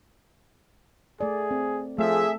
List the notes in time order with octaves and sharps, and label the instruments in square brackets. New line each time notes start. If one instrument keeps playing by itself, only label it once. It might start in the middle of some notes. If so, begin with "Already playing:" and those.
[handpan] A3 D5 [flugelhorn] G#4
[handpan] C4
[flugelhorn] F3 [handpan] A3 [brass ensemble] G#4 E5